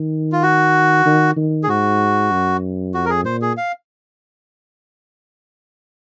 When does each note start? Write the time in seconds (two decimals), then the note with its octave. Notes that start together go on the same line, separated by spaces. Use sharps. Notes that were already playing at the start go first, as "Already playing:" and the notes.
Already playing: D#3
0.32 F4
0.43 F#4
1.06 D#3
1.37 D#3
1.63 G#4
1.68 G#2 F#4
2.32 F#2
2.94 F2 F#4
3.06 A#4
3.10 G#4
3.25 A#2 C5
3.42 G#4
3.57 F5